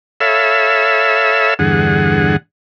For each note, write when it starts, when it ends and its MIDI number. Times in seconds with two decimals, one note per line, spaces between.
0.20 1.54 69
0.20 1.54 73
0.20 1.54 76
0.20 1.54 77
0.20 1.54 83
0.20 1.54 88
1.59 2.36 40
1.59 2.36 43
1.59 2.36 50
1.59 2.36 68
1.59 2.36 78